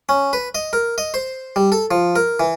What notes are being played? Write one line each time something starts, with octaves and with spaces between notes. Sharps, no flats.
C#4
B4
D#5
A#4
D#5
C5
G3
A4
F3
A#4
E3